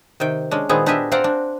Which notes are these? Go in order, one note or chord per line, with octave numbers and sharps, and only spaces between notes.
C3 D#3 G5
G#3 C#4 D4
A#2 D#3 G#3 B3 C4 G#4
D4 G4 G#4 D#5 E5
C4 C5 D5 F5 F#5 A#5
D4